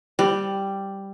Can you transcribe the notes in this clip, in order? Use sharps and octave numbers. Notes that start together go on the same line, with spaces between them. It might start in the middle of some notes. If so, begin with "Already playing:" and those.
G3